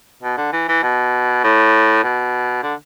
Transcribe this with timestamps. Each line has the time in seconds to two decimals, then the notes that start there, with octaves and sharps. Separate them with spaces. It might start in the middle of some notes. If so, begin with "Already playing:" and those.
0.23 B2
0.37 D3
0.52 E3
0.69 E3
0.83 B2
1.44 A2
2.03 B2
2.63 D3